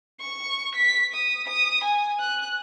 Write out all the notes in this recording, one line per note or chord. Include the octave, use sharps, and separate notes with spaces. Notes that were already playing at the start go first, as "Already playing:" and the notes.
C#6
B6
D#6
D#6
G#5
F#6